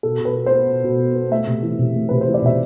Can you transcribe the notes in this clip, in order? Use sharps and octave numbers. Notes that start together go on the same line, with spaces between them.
B2 A4
B2
B4
B3
C5
B3
B2
B2
B3
B3
A3 E5
C3
E3
C3
A3
C3 B4
C5
E3
D5
C3 E5